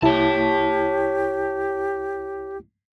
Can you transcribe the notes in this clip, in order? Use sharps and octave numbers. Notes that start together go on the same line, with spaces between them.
C2 E4 G4 C#5 A5